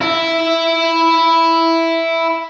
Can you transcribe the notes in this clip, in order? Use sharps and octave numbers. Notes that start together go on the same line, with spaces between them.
E4 E5